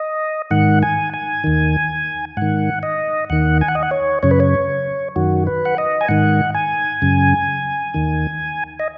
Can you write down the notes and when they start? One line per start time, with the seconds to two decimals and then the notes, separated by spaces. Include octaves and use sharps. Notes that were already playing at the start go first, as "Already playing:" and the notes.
Already playing: D#5
0.51 G#2 D#3 F#5
0.83 G#5
1.13 G#5
1.44 D#2 D#3
2.37 G#2 D#3 F#5
2.83 D#5
3.30 D#2 D#3 F#5
3.61 G#5
3.68 F#5
3.75 D#5
3.82 F#5
3.91 C#5
4.23 F#2 C#3 C#5
4.31 B4
4.40 C#5
5.16 F#2 D#3 F#4
5.47 B4
5.65 F#5
5.78 D#5
6.01 G#5
6.08 G#2 D#3 F#5
6.54 G#5
7.02 F#2 C#3
7.94 D#2 D#3
8.80 D#5